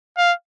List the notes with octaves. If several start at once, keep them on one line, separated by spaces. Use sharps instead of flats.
F5